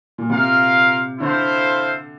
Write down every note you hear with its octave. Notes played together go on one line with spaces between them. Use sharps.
A#2
C3 F4 A#4 F5
D3 E4 A4 C5 F5